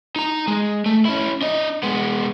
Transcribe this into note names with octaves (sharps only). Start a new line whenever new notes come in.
D#4 A#5
G#3
A3
C#4 E4
D4 D#5
G#3 B3